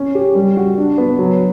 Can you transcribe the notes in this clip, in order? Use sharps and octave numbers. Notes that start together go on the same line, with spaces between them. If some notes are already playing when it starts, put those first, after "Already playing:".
Already playing: C#4 C#5
G4
G3
F#4
D4
B3
F#3